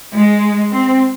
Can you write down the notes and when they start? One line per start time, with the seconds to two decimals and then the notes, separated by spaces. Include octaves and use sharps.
0.17 G#3
0.74 C4